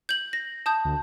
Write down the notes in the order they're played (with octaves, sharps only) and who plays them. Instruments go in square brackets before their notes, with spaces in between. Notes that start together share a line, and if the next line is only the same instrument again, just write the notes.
[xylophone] G6 F#7
A#6
A5 D#6 G6
[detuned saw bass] D2